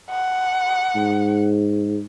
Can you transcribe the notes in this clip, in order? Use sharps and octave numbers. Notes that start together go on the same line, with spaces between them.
F#5
G#2